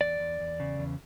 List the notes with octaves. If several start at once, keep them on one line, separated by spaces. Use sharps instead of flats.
E2 D5
E2
E2
C#3
E2